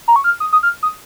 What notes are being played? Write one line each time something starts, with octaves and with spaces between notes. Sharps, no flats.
A#5
C#6
F6
D#6
D#6
F6
D#6